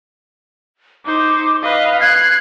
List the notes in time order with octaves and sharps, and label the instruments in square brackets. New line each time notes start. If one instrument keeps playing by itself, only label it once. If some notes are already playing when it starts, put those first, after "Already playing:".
[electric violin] D#4 C5 [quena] D6
[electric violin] B4 D#5 [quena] F5
[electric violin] F#6 C7 [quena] G#6